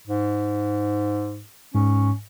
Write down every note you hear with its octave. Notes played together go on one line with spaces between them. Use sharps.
G#2
G#2 C#4